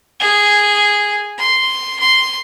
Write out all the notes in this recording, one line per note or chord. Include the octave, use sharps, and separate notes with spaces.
G#4
C6
C6